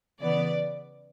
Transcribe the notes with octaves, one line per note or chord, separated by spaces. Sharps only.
C#3 E3 B3 D5